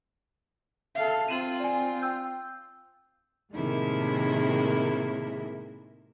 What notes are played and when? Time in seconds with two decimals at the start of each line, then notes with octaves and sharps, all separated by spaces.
0.95 A4 E5 F5
1.28 C4 F4 D#7 E7 F#7
1.60 D5 G#5
2.02 G5 E6 G6
3.53 A2 C3 D#3 G#3 A#3 E4